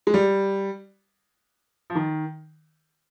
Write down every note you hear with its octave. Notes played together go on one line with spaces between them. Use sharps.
G#3
G3
F3
D#3